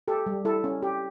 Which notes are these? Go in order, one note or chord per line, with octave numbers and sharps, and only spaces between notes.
G4 A4
G3
E4 A4
C#4
G4